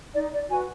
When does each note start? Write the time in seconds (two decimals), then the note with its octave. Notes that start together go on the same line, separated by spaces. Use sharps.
0.14 D#4 D5
0.32 D5
0.49 F#4 B4 G#5